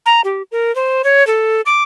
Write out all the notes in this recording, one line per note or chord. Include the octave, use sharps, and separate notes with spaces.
A#5
G4
A#4
C5
C#5
A4
D6